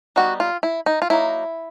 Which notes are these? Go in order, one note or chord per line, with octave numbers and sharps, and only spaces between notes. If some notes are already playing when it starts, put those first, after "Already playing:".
G3 B3 D#4 F#4
F4
E4
D#4
F4
F#3 A#3 D#4 E4